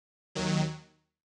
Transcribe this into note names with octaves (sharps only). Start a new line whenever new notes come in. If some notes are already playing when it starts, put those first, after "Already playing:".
D#2 D#3 F#3